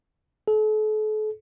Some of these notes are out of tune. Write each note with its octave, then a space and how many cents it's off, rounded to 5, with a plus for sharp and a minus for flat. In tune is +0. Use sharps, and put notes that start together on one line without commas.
A4 -40